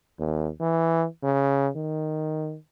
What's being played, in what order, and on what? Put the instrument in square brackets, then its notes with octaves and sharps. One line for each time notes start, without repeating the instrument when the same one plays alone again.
[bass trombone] D#2
E3
C#3
D#3